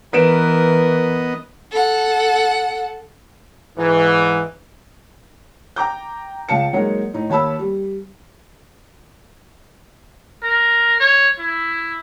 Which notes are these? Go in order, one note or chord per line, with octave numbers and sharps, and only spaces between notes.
E3 B3 A#4 B4 D#5 D7 E7
A4 F#5
G#2 E3
G5 A#5 D6 G6
C#2 F5 A5 C#7
F#3 G#3 A#3 D#4
A2 D#4
D#2 C#5 A5 B5 E6
G3
A#4
C#5
E4